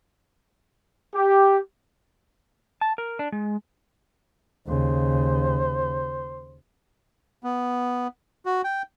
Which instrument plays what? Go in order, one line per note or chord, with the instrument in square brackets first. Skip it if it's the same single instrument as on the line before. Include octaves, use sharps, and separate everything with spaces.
[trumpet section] G4
[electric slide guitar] A5
A#4
D4
G#3
[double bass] D#2 C#3 [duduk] C5
[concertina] B3
F#4
G5